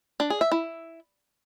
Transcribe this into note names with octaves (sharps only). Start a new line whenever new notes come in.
D4
G#4
E5
E4